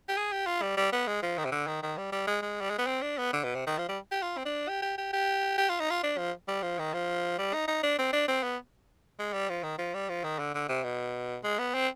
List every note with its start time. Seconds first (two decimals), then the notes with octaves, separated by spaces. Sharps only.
0.09 G4
0.17 G#4
0.32 G4
0.46 F4
0.62 G3
0.77 G3
0.92 B3
1.07 G#3
1.22 F3
1.38 D#3
1.45 C3
1.52 D3
1.67 D#3
1.82 D#3
1.97 G3
2.12 G3
2.27 G#3
2.42 G#3
2.61 G3
2.70 G#3
2.78 B3
2.87 C4
3.02 D4
3.18 B3
3.33 D3
3.44 B2
3.55 C3
3.67 D#3
3.78 F3
3.88 G3
4.11 G4
4.22 F4
4.37 C4
4.45 D4
4.68 G4
4.82 G4
4.98 G4
5.13 G4
5.58 G4
5.69 F4
5.80 D#4
5.90 F4
6.03 D4
6.18 F3
6.48 G3
6.62 F3
6.79 D#3
6.94 F3
7.38 G3
7.53 D#4
7.68 D#4
7.83 D4
7.98 C4
8.13 D4
8.28 C4
8.43 B3
9.19 G#3
9.33 G3
9.49 F3
9.63 D#3
9.78 F3
9.94 G3
10.09 F3
10.24 D#3
10.39 D3
10.54 D3
10.69 C3
10.84 B2
11.44 G#3
11.58 B3
11.74 C4